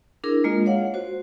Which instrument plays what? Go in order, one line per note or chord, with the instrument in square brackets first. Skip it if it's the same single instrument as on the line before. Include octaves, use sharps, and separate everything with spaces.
[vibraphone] D4 E4 G#4 A#4
G#3 A#3 F4 D#5
C#5 F5 F#5
F#4 C5